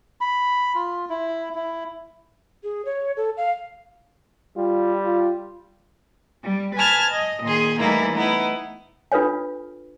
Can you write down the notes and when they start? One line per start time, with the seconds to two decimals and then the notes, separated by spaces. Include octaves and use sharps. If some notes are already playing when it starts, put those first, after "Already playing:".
0.21 B5
0.75 F4
1.10 E4
1.55 E4
2.63 G#4
2.85 C#5
3.17 A4
3.37 F5
4.57 G3 F4
5.05 F4
6.43 G3
6.75 B4 G#5 A5 F6 G#6
7.11 D#5
7.44 A#2 D#3 G#4 C6
7.78 E3 G3 A3 A#3 D#4 E4
8.14 A3 B3 D#4 E4
9.12 D4 F4 A4 B4 C#5 G#5